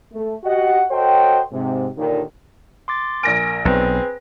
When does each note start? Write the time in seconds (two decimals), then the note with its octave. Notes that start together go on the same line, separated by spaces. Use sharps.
0.13 A3
0.44 F#4 G4 D#5 F#5
0.91 F#4 A4 C5 C#5 D#5 G5
1.52 G#2 C3
1.97 D#2 A#2 D3 D#3
2.88 C6 D6 A6
3.23 A#1 A#4 G#5 F6 A#6 D7
3.65 B1 C4 G#4 B4